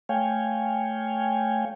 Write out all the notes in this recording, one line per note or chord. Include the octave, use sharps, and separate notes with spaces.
A3 C#5 F5 G5 G#5